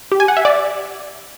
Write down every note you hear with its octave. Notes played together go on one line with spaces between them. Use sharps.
G4
G#5
F#5
E5
D5